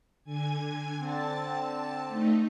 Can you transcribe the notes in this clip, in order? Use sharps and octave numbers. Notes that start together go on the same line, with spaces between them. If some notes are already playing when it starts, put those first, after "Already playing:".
D3 G#5 G#6
D3 C4 A5 A6
A3 D#4